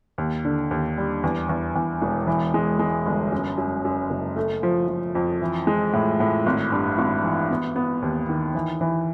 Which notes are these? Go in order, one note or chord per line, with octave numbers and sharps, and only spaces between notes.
D#2
D3
D#2
G3
E2
E2
E2
E1
E3
G#3
G#3
G1
F#2
F#2
F#2
F#1
A3
F3
F3
F2
E3
G#3
A2
A2
G#1
G2
G#1
E3
B3
B3
D#2
D#3
E3
E3